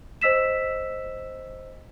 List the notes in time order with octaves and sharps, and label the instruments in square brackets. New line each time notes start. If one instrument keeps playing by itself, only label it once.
[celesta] C5 D#5 E6 B6 E7